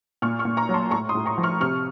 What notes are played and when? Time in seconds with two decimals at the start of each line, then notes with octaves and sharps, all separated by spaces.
0.22 A#2 C#6 F6
0.39 C#6 F6
0.45 A#2
0.57 A#5 C#6
0.69 F#3
0.74 A5 C6
0.91 A2 A#5 C#6
1.09 C6 D#6
1.15 A2
1.26 A#5 C#6
1.38 F3
1.43 C#6 F6
1.60 C3 C#6 F6